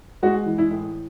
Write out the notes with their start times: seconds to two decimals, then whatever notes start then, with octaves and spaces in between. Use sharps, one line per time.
0.22 G#3 F#4
0.46 E3
0.58 E4
0.71 A2